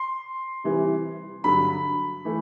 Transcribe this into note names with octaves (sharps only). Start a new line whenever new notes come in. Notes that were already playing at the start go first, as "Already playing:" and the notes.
Already playing: C6
C3 E3 G3
G2 D3 F#3 B5
E3 A3